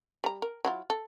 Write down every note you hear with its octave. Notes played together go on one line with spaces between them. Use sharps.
G3 A#5
A#4
F#3 E4 F4
A4